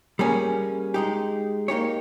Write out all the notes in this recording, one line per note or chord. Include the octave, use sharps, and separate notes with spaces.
G3 A#3 C#4 G#4
G#3 D#4 G4
A#3 D#4 G4 C#5